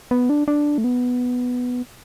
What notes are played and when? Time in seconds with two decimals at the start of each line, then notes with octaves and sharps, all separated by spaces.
0.11 B3
0.29 D4
0.48 D4
0.78 A3
0.84 B3